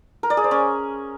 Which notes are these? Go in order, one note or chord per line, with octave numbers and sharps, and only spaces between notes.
A#4
D5
G#4
C5
C#4